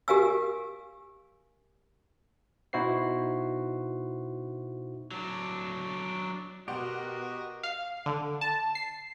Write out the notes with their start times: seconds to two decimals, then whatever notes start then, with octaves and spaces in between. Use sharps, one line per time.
0.08 G4 A#4 F5 G#5 E6
2.73 B2 D#4 E4 F#4 C5 C7
5.11 F#3 D4
6.68 B2 F#4 G4 A#4 D5 D#5 F#5 C6
7.63 F5
8.06 D3
8.41 A5
8.75 C7